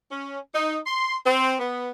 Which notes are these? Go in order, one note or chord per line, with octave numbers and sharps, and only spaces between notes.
C#4
D#4
C6
C4
B3